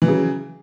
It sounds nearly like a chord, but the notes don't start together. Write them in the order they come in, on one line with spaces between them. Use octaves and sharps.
E3 F#3 C#3